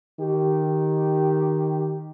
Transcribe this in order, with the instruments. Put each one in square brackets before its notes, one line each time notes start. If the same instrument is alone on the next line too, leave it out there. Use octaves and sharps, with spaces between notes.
[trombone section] D#3 G4